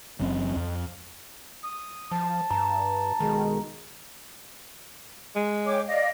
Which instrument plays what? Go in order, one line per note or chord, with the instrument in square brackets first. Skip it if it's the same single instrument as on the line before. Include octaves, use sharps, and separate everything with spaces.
[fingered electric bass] F#1 F#2 C4
F2
[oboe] D#6
[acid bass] F3 [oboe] A5
[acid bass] G2 [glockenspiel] A#5
[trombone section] B1 G#3 [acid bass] D#3
[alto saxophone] G#3
[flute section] C#5 G5 D6
D5 D#5 F5